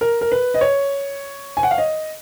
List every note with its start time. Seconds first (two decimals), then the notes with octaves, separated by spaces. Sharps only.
0.01 A#4
0.21 A#4
0.32 B4
0.54 D#5
0.61 C#5
1.57 G#5
1.63 F#5
1.71 F5
1.78 D#5